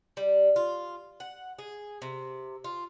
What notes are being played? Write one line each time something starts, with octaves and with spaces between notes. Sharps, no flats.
G3
F4
F#5
G#4
C3
F4